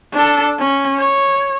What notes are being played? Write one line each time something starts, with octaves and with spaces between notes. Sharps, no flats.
D4 A4
C#4
C#5